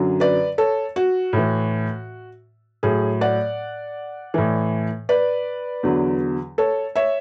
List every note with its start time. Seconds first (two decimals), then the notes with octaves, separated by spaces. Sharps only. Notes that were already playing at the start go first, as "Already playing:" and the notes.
Already playing: F#2 D3 F#3
0.20 B4 D5
0.58 A4 C#5
0.96 F#4
1.33 A2 E3
2.83 A2 F#3 G#4
3.21 D5 F#5
4.34 A2 E3
5.09 B4 D5
5.83 E2 D3 F#3
6.58 A4 C#5
6.95 C#5 E5